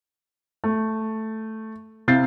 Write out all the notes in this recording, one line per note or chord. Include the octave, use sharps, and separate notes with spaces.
A3
C3 E4 F5 G6 A6 C7